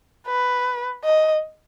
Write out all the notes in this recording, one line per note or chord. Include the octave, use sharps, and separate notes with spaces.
B4
D#5